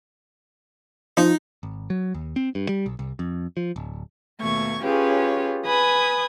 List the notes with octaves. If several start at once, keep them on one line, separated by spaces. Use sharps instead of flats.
F3 D#4
G#1
F#3
D#2
C4
G2
G3
B1
C2
F2
F3
D1
D#2 B2 A3 C#6 G#6
C#4 F4 G4 G#4 B4 C#5
B4 G#5 B5 D#6 G#6